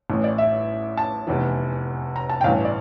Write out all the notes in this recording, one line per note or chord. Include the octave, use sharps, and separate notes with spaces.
A1 A2 E3
D5
E5
A5
F1 E2 E3
A#5
A5
G5
A1 G2 E3 F5
D5